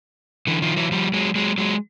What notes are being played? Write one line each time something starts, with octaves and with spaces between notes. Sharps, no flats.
D3 E3
D#3 F3
E3 F#3
F3 G3
F#3 G#3
F#3 G#3
F#3 G#3